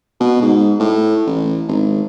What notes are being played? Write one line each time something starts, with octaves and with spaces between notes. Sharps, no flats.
B2
G#2
A2
A1
G#1